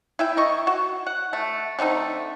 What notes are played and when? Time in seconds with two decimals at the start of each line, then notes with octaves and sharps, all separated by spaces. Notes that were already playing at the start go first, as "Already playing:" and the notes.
0.19 E4 E5 G5
0.37 D#3 D#5 C#6
0.67 F#4
1.07 F#5
1.33 A3
1.79 D3 A3 C4 D#4